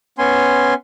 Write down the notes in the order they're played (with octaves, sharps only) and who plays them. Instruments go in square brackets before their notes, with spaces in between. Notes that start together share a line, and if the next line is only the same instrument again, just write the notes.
[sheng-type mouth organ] B3 C#4 G#5 C6